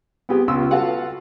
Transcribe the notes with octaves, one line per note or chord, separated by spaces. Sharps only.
B3 C4 G4 G#4
C#2 B3 C#4 F4 C6 E6
F4 F#4 A4 B4 F5 F#5